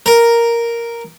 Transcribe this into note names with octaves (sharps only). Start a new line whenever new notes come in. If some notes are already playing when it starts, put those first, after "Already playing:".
A#4